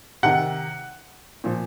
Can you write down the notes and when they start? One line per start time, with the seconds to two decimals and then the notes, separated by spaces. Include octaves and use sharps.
0.23 C3 D#3 F#5
1.44 A#2 F3